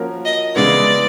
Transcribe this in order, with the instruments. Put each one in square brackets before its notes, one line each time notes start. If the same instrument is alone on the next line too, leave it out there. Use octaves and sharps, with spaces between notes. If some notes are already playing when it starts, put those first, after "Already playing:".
Already playing: [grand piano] F3 A#3 C#4 F#4 A#4
[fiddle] D#5
[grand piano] C#3 E3 G#3 B3 E4 [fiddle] D5